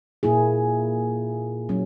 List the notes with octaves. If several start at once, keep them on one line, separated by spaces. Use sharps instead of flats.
A#2 A#3 E4 G#4
F#3 C#4